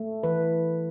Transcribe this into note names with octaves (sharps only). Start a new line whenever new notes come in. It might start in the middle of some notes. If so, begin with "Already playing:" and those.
Already playing: A3
E3 B4